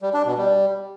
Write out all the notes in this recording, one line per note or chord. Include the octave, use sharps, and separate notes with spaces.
G3
D4
B2
G3